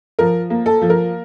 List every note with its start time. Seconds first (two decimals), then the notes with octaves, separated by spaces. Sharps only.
0.19 F3 A#4
0.50 A#3
0.66 A4
0.82 F3
0.90 A#4